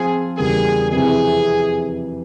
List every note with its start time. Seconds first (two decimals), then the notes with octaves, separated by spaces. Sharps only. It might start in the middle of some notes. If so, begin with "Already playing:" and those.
Already playing: F3 C4 F4 G#4
0.37 E2 C#3 G3 A#3 G#4
0.91 F2 C3 E3 G#4